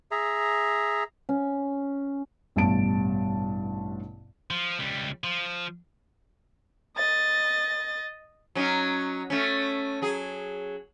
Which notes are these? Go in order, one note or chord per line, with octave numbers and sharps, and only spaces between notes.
G#4 E5 A#5
C#4
A1 G2 B2 A5 D7
F3
C#2 G3
F3
D#5 A6
F#3 C#4 D#4
A3 C#4
F#3 G#4